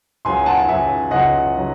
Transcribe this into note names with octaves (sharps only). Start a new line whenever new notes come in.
C#2 C#3 F#3 G#5 C6
F#5 A5
C#2 C#3 F#3 E5 G#5
C#2 C#3 F#3 D#5 F#5
C#3 F#3